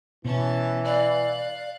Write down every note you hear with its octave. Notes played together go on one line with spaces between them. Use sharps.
B2 E3 C#4 A5
D5 F5 F#6